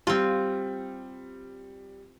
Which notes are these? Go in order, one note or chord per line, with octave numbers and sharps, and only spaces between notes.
G3 C4 F4